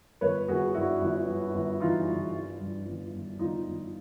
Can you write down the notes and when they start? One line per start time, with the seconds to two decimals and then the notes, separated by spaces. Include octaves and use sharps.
0.21 G1 B4 C#5
0.48 G1 F#4 G#4
0.74 G2 E4 F#4
1.01 G1
1.28 G2
1.54 G1
1.80 E3 D#4 F4
2.08 G1
2.34 G2
2.60 G2
2.87 G1
3.14 G1
3.39 G1 D#4 F4
3.67 G1